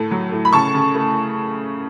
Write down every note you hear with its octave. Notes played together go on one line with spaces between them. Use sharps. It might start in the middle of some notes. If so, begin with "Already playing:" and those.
Already playing: A2 A3
F#3
A2
B5
C#3 A5 C#6
C#3
A3